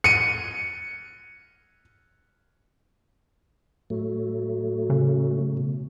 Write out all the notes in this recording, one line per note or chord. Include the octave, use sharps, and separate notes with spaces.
C#7 D#7
A2 F#3 A3
C#3
B2